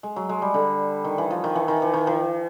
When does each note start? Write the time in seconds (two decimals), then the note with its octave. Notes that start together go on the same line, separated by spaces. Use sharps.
0.03 G#3
0.16 F#3
0.29 G#3
0.42 G3
0.54 D3
1.04 D#3
1.18 E3
1.31 F3
1.44 D#3
1.55 E3
1.68 D#3
1.82 E3
1.94 D#3
2.07 E3